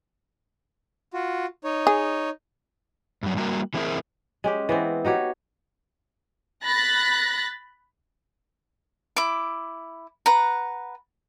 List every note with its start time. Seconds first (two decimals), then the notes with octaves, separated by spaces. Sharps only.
1.14 F4 F#4
1.64 D#4 C#5
1.87 G#4
3.23 G2 F#3
3.37 G3 A#3 F#4 A#4
3.74 E3 G3 C4 E4 G#4 A#4
4.44 G#3 C#4 G4
4.69 E3 B3 C4
5.05 D#4 F#4 G4 C#5
6.64 B5 F#6 A6 A#6
9.16 E4 D6
10.26 B4 F#5 A#5